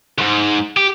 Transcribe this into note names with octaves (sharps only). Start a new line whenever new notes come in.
D#2 G#2
G4